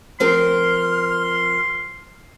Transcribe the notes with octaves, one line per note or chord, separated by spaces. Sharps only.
F3 C4 A#4 C6 F6